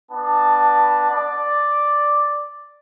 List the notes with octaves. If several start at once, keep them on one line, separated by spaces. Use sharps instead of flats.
B3 D4 A5
D5